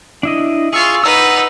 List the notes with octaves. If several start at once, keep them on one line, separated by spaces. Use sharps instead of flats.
D4 E4 D#5
F4 G#4 C#6 E6
D#4 B4 F#5 E6